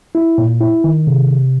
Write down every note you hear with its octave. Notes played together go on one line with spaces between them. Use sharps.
E4
A#2
E4
D#3
C3
C3